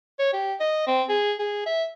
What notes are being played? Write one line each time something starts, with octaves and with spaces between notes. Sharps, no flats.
C#5
G4
D#5
C4
G#4
G#4
E5